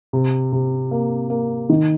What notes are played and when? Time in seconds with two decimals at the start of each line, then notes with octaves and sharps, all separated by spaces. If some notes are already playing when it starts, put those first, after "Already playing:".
0.13 C3
0.52 C3
0.91 A#3
1.30 A#3
1.70 D#3